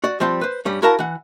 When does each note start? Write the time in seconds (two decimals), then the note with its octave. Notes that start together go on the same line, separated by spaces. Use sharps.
0.04 F#4 D5
0.20 F3 G3 C4 G5 C6
0.41 B4 C5
0.65 G2 G3 C#4
0.82 E4 F#4 A#4 F5 A5 A#5
0.99 E3 F#5